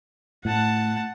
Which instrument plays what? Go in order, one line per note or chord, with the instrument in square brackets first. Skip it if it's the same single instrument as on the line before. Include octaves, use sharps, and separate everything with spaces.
[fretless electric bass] A2 [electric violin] F#5 A5